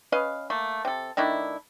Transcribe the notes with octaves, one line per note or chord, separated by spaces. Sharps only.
C#4 B4 D#5 F5
A3 A#3
C3 A4
D#3 A3 D4 E4